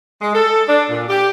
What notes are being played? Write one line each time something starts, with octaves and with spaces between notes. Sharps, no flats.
G#3
A4
D4
A#2
G4